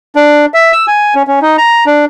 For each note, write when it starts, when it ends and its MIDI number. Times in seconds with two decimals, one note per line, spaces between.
0.16 0.46 62
0.54 0.72 76
0.72 0.86 88
0.87 1.14 80
1.15 1.23 61
1.27 1.39 61
1.42 1.57 63
1.58 1.84 82
1.86 2.05 62